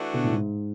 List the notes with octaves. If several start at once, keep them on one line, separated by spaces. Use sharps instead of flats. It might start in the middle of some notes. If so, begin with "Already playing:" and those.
Already playing: E3 A3 D4 F#4
B2 D3
A2
G#2